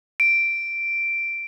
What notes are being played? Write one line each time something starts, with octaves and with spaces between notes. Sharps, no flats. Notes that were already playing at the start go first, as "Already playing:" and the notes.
D7